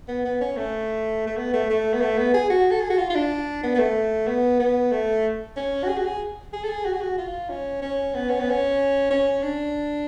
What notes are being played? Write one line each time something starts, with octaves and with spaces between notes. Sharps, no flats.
B3
B3
C#4
A3
A3
B3
A3
A3
B3
A3
B3
G#4
F#4
A4
G#4
F#4
F4
F4
D4
B3
B3
A3
B3
B3
A3
C#4
F#4
G#4
F#4
G#4
G#4
A4
G#4
F#4
G#4
F#4
F4
C#4
C#4
B3
C#4
B3
C#4
C#4
D4